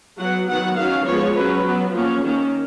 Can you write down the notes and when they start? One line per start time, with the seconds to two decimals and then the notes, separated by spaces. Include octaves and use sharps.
0.19 F#3 B3 F#5
0.48 D#3 F#3 B3 F#5
0.77 D#3 F#3 C#4 F5
1.06 F3 G#3 B3 C#5
1.36 F#3 C#4 B4
1.65 F#3 B3
1.93 F3 A#3 C#4
2.23 D#3 A#3 C#4